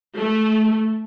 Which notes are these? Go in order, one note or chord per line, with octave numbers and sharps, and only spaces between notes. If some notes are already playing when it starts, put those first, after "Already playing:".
A3